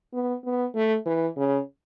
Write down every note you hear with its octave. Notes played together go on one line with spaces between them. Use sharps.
B3
B3
A3
E3
C#3